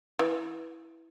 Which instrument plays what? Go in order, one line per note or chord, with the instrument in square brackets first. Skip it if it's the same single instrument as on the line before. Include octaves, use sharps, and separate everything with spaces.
[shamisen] E3